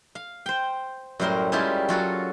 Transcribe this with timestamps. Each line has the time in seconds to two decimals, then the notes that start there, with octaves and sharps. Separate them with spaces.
0.15 F5
0.46 C5 G5
1.20 F#2 A2 G3 A#4 C5 C6
1.52 G3 G#3 C#4 E4 F4 G4
1.89 F#3 F4 F#4 A4